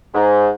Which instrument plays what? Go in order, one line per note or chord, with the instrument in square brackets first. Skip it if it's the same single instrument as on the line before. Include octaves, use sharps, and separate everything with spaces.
[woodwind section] G#2